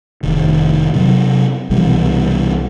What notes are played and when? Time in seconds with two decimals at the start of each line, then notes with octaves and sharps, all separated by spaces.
0.23 F1 D#3
0.94 C3 F#3
1.70 C2 B2 E3 G3